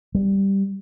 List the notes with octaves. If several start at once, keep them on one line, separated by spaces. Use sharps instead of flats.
G3